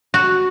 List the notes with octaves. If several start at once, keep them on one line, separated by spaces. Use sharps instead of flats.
F#4